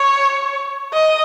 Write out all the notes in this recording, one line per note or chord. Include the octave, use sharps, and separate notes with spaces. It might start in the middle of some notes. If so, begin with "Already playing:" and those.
Already playing: C#5
D#5